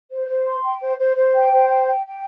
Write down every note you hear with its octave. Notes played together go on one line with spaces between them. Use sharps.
C5
C5
C6
G5
C5
C5
C5
G5
C5
G5
G5
G5